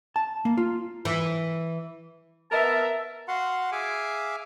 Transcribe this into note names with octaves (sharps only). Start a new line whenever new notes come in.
A5
A#3
F4
E3
B3 A#4 E5 A5
F#4 F5 F#5 C6
G#4 E5 F5 G#5 D6